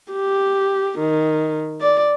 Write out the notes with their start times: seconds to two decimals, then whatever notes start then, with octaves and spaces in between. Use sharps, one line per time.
0.12 G4
0.99 D#3
1.81 D5